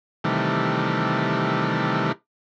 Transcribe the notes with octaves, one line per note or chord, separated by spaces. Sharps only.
C3 D#3 E3 G3 A3